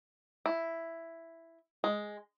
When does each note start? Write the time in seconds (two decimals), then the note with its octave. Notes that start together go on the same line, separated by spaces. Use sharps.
0.46 E4
1.84 G#3